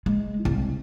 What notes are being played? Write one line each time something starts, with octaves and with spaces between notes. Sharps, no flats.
G#3
C2